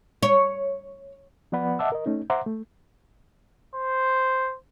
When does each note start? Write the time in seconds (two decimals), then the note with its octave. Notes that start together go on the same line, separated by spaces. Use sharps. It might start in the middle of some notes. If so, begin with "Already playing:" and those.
0.23 C#5
1.52 F3 B3 B4 D5 F#5 B5
1.79 D#5 E5 F#5 A5 D6 E6
1.92 A#4 D#5
2.06 A3 C#4 D#4
2.30 C5 E5 F#5 A#5 C6 D6
2.46 A3
3.75 C5